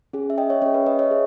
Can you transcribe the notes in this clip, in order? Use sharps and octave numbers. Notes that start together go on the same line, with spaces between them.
C#4 G#4
E5
D#5 G5
C#5 E5
C#4 G#4 C#5
B4
B4 D#5
C#5 E5
G#4